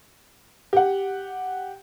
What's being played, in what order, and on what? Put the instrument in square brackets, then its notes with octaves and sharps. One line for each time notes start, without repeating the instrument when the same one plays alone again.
[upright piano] G4 F#5